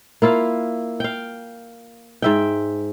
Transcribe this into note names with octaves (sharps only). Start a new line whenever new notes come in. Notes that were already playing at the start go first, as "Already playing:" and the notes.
A#3 E4 F4 F5
F5 G5
G#2 E5 G5